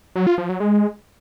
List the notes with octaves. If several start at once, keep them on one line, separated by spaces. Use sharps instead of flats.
F#3
F4
F3
F#3
G#3